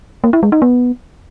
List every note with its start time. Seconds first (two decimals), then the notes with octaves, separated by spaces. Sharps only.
0.24 A#3
0.33 E4
0.43 G#3
0.52 D#4
0.62 B3